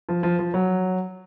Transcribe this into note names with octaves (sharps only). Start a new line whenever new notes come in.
F3
F3
F3
F#3